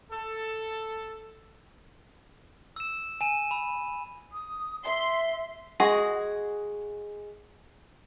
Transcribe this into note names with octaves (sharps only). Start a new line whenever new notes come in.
A4
E6 E7
G#5 D#7 E7
B5
D#6
E5 C6
G#3 F#4 G#4